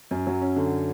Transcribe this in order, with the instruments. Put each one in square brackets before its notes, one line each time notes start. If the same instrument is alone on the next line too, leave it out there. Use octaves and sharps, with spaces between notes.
[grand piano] F#2
F#3
C#4
D3